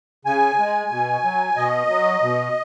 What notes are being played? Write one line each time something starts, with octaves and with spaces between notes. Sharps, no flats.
C#3 G#5
G#3
B2
F#3
B2 D#5
F#3
B2